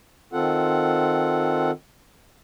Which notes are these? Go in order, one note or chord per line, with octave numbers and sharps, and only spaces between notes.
D#3 C4 F4 A4 F#5